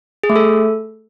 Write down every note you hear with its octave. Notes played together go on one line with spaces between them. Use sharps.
G#4
A3
A4